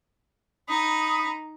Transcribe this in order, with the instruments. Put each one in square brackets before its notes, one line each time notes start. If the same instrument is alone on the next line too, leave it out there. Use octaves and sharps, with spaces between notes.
[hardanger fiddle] D#4 [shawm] B5 [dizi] D#6